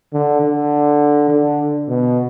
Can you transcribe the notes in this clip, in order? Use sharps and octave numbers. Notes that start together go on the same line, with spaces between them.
D3
D3
D3
B2